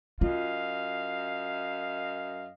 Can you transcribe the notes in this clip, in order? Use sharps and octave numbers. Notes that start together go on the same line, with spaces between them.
F#2 F4 D#5 F5